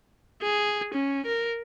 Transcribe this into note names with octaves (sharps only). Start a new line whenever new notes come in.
G#4
C#4
A#4